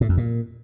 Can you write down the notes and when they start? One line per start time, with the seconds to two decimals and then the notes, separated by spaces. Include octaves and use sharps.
0.01 A2
0.09 F2
0.17 A#2